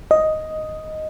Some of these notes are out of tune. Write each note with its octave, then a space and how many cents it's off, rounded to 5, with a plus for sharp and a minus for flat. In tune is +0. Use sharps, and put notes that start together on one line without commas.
D#5 +5